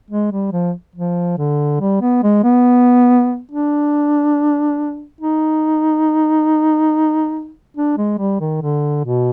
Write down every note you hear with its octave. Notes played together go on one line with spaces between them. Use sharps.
G#3
G3
F3
F3
D3
G3
B3
G#3
B3
D4
D#4
D4
G#3
G3
D#3
D3
B2